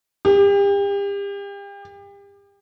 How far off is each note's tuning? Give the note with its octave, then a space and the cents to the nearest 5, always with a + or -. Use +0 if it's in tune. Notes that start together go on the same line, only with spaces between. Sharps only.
G4 +35